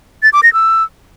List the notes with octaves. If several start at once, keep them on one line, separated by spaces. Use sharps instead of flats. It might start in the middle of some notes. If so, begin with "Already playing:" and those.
A6
D6
A#6
E6